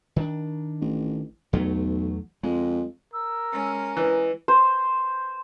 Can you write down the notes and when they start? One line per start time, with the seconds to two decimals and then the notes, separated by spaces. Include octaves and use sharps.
0.16 D#3 D4
0.81 A1
1.53 B1 E2 F#3 A3
2.43 F2 G#3
3.13 A#4 E6
3.52 G#3 C#4
3.97 E3 D#5
4.48 C5